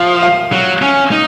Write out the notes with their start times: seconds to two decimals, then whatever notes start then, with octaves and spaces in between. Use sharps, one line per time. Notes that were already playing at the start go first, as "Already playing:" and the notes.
Already playing: F3 F5
0.23 F5
0.52 F#3
0.82 C#4
1.11 D#4